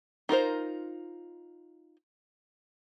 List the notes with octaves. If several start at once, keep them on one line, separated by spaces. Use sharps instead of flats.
D#4 F4 A#4 C5